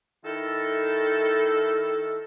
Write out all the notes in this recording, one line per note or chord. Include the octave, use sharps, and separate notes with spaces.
D#3 E4 A4